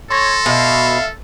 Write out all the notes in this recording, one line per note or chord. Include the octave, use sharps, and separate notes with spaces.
A4 C#5 C6 A#6
B2 E5 F5